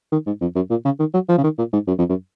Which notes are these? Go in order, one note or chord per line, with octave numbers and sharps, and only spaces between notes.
D#3
G#2
F2
F#2
A#2
C#3
D#3
F#3
F3
C#3
D#3
A#2
G#2
F#2
F2
F#2